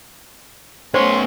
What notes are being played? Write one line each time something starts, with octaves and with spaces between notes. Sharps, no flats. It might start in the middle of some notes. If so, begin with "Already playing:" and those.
A3 B3 C#4 C5 C#5 C6